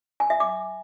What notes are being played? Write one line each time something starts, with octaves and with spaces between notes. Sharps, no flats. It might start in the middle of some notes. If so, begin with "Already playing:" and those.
G#5
E5
D6